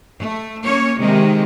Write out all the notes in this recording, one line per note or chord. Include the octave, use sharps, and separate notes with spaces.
A3
A#3 C#4 C#5
C3 D#3 G#3